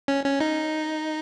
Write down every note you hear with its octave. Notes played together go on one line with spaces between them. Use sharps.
C#4
C#4
D#4